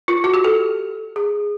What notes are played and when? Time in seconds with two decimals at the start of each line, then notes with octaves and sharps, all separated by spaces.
0.08 F4
0.24 F#4
0.34 G4
0.44 A4
1.16 G#4